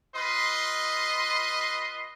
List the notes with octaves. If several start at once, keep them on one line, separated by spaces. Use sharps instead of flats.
F4 B4 D#5 C6